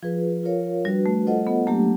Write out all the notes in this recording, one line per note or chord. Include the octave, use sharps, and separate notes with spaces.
F3 F4 G#4 B4
F4 A#4 C#5 F5
G3 D4 F#4 B4
A3
F4 A4 C5 D#5 F#5
B3
F#3 A3 A#3 D4 G4